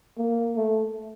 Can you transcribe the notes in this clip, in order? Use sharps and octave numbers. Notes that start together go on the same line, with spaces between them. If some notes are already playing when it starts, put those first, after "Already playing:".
A#3
A3